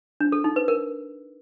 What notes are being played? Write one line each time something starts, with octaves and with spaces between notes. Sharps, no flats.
D4
A4
D#4
B4
A#4